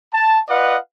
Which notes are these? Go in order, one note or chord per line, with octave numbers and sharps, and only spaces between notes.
A5
F4 B4 D5 D#5 F5 F#5